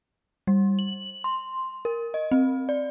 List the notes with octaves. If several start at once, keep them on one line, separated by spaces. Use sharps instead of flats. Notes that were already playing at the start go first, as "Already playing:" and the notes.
G3
F#7
C6
A#4
D#5
C4
D5